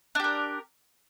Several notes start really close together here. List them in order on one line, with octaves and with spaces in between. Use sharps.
D4 G4 A#4